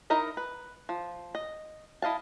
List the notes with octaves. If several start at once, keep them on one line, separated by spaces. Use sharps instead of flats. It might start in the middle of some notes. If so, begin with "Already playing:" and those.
D#4 E4 A#4 D#5 E5
B4
F3
D#5
E4 D#5 F5 A5